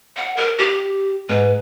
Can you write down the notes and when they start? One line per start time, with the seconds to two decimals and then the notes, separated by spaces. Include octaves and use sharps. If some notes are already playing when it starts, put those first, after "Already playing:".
0.16 F#5
0.37 A#4
0.58 G4
1.29 G#2 B4